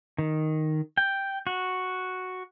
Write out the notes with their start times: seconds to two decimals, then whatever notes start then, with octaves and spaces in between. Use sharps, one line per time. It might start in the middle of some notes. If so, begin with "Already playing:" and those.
0.18 D#3
0.97 G5
1.47 F#4